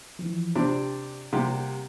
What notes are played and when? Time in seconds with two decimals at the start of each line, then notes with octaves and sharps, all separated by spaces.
0.19 E3 F3
0.55 C3 C4 D4 G4
1.33 C3 G3 A#3 F#5